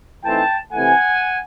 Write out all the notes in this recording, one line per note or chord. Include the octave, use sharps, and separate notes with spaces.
E3 A3 C4 D#4 G5 A5
C3 E3 A3 F#5 G#5